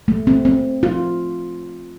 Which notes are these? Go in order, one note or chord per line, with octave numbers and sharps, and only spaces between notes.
A3
C4
C4
F4